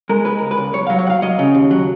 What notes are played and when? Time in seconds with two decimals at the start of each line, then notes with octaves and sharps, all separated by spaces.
0.09 G#3 A#4
0.25 G#3 B4
0.39 C#2 A#4
0.51 B4
0.57 C#2
0.73 B1 C#5
0.87 F#3 F5
0.99 C#5
1.06 B1 F#5
1.10 F5
1.22 F#3 D#5
1.39 C#3
1.55 D#2
1.71 F#3